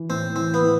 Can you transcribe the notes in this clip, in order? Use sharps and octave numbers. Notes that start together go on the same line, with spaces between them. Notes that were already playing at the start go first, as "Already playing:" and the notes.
Already playing: E3
A2 C4
E3 C4
B3
A2